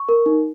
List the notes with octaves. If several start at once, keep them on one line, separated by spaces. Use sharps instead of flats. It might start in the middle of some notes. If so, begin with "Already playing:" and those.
Already playing: C#6
A#4
D#4